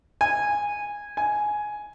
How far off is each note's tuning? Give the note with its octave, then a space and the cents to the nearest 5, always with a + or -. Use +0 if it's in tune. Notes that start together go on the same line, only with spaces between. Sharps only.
G#5 -10
G#5 +10